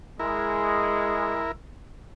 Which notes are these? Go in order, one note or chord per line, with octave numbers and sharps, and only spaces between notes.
G#3 E4 A#4